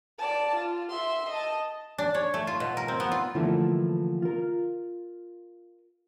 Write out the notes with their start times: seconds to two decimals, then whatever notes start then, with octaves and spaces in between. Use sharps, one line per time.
0.19 D5 A5
0.56 F4
0.90 E5 C6
1.30 D#5 A5
1.98 D4
2.15 C#5
2.34 A3
2.47 F4
2.60 B2
2.77 A#4
2.88 C4
3.00 B3
3.12 F4
3.35 D3 E3 F3 A3 A#3
4.22 F4 A#4